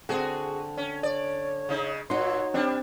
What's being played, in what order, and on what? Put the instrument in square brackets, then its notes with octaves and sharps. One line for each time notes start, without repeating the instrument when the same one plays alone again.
[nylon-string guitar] D3 C4 [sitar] F#4 G#4
[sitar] C#4
[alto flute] C#5 [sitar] D5
[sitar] C#3 D#4
[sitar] A#2 [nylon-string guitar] D#4 F#4 [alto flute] C#5 [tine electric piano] C6
[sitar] G3 D4 [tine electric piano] C4